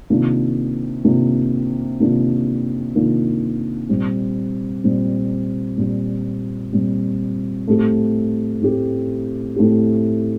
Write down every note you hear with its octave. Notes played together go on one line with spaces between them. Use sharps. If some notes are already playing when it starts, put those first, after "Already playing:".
C3 D#3 A#3 D4 F4
C3 D#3 A#3 D4 F4
C3 D#3 A#3 D4 F4
C3 D#3 A#3 D4 F4
A#2 G3 C4
A#2 G3 C4
A#2 G3 C4
A#2 G3 C4
A2 A3 C4 G4
A2 A3 C4 G4
A2 A3 C4 G4